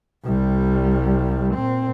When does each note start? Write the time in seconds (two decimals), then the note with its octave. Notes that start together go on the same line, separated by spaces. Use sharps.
0.24 C2 G3
1.54 A#2 C4